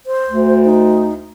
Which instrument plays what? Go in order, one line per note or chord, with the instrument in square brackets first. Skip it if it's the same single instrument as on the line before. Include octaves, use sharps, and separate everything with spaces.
[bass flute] C5
[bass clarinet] D2
[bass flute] D#4